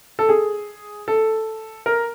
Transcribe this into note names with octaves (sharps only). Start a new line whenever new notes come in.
A4
G#4
A4
A#4